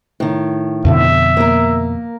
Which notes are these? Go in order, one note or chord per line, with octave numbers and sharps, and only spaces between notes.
A2 D#3
F2 B2 D3 E5
A#3 A#4